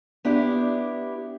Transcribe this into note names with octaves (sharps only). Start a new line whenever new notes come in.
B3 D4 E4 G4